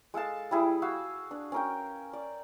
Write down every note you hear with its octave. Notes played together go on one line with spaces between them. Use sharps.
G#3 A4 F5 A5
G3 E4 G#4
F#4 F5 E6
D4
C#4 A#4 G5
D5